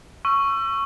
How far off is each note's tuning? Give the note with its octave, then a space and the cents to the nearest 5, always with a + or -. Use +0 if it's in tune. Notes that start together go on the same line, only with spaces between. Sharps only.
C#6 +0 E6 +35